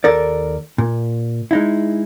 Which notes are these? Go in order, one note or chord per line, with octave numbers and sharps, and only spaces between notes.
D#2 A4 A#4 D5
A#2
G#3 D#4 E4